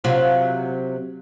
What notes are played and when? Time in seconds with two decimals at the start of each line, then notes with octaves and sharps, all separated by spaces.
0.04 C3 F#3 F4